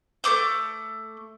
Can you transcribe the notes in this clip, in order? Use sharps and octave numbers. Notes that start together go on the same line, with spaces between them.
A3 C4 D6 G6